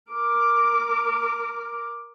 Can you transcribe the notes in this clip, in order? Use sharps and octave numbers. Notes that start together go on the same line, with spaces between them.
A#4 D6